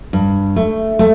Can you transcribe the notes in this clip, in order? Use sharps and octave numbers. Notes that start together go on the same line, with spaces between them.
G2
A3
A3